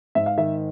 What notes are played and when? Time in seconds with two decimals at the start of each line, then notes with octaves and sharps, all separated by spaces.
0.15 G#2 E5
0.26 F5
0.38 D#3 E5